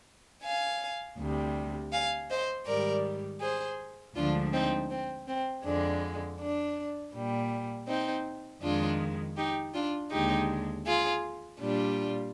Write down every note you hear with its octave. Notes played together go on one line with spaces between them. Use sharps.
F5 G#5
D2 C3 G3
F5 G#5
C5 D#5
G#2 D#3 G3 A#4 D5
G#4 C5
D2 D3 F3 G#3 D4 F4
C4 D#4
C4
C4
F2 D3 G#3 D4
D4
A#2 G3
C4 D#4
F2 D#3 G#3 D4 F4
D#4 G4
D4 F4
D#2 D3 G#3 D#4 G4
F4 G#4
A#2 G3 D4 F4